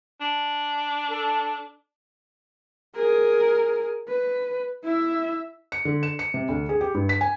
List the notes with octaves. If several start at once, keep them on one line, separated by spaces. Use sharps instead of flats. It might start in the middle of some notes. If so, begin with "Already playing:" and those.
D4
A4
G#4 A#4
B4
E4 E5
C#7
D3
E7
C#7
C3
D2
G#4
G4
G2
B6
G#5